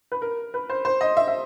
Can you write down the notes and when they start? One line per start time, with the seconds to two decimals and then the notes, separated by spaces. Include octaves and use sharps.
0.12 B4
0.22 A#4
0.54 B4
0.70 C5
0.85 C5
1.01 D#5
1.17 E5
1.27 E5